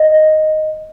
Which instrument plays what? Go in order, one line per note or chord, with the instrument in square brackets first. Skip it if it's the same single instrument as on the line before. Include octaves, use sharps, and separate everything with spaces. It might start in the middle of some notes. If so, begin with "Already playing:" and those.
Already playing: [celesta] D#5